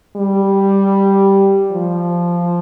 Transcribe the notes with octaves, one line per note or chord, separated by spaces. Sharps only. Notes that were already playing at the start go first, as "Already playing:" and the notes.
G3
F3